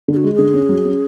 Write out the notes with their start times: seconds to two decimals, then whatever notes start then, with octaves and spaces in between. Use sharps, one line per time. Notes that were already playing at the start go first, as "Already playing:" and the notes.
0.08 D3 G#4
0.17 F#4
0.24 G#3
0.34 D3 G#4
0.54 C#4
0.69 F#3
0.85 C#4